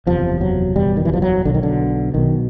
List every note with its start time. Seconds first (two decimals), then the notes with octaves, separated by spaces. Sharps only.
0.07 F#1 E2 C3 F3
0.41 F#3
0.76 F#1 E2 B2 G3
0.97 D#3
1.05 E3
1.13 F3
1.22 F#3
1.45 B1 B2 D3
1.54 D#3
1.63 D3
2.14 B1 B2 D#3